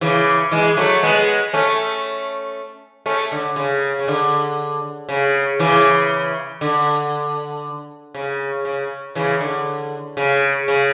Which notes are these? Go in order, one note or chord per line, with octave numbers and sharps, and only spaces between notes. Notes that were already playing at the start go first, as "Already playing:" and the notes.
C#3 E3
E3 G#3
F#3 A3
G#3 B3
A3 C#4
A3 C#4
D3
C#3
C#3
D3
C#3
C#3 E3
D3
C#3
C#3
C#3 E3
D3
C#3
C#3